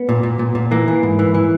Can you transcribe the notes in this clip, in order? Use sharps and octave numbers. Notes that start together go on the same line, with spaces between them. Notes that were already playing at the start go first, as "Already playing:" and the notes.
Already playing: B3
A#2
A#2
A#2
A#2
E3 A#3
E3
G#2
E3
E3